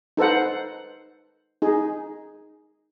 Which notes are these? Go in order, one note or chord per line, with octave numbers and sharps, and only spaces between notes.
D#4 A4 B4 C5 F#5
D#4 G#4